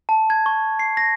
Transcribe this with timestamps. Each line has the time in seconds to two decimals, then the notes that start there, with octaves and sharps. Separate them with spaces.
0.09 A5
0.30 G#6
0.46 C#6
0.79 C7
0.97 A#6